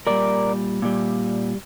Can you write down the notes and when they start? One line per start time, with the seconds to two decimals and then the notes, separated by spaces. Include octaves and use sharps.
0.07 A#2 G3 A#4 D5
0.82 A#2 G3